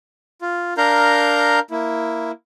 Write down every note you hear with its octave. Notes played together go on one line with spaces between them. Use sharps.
F4
D4 A#4 F5 A#5 G6
A#3 E4